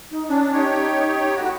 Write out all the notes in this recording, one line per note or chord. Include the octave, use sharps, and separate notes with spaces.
D#4
C#4 D4
D#4 G4 C#5
A2 F#4